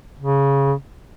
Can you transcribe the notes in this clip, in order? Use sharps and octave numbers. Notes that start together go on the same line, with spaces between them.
C#3